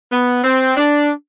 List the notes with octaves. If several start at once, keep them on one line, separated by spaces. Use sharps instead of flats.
B3
C4
D4